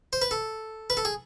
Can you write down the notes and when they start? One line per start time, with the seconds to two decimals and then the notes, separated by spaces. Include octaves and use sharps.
0.13 C5
0.22 B4
0.31 A4
0.90 B4
0.97 A4
1.05 G#4